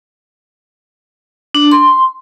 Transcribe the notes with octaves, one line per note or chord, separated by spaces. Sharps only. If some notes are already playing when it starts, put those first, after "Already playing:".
D4
C6